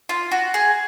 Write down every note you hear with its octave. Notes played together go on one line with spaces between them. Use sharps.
F4
F#4
G#4